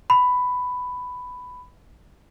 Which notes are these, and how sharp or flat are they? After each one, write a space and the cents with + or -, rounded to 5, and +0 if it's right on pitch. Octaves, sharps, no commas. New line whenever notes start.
B5 +10